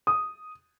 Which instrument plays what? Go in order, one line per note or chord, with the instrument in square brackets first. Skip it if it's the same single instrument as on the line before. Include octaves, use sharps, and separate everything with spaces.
[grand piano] D#6